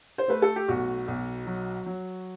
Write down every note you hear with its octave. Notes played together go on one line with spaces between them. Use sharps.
C5
A3 B4
A4
G4
B1 F#4
B1
F#3
F#3